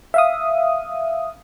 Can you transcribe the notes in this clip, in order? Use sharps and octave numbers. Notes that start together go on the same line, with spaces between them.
E5 F5 D#6